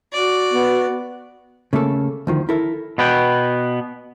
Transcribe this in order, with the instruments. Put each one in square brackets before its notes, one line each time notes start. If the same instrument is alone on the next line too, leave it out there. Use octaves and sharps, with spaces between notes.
[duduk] F#4 [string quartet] D5
[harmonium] B3
[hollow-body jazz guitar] C#3 A3 A#3 A4
D2 D#3 F3
E4 A4 A#4
[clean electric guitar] B2 B3 B4 G5